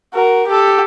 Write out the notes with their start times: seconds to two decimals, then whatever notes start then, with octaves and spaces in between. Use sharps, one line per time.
0.14 F#4 A#4
0.47 G4 A4